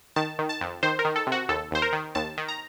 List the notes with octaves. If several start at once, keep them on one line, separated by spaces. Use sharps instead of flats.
D#3 A5
D#3
A5
F2
D#3 C5
A#4
D#3
A4
C3
F#4
D#2 A4
D#2 C5
A#4
D#3
D#2 A5
D#3
A#5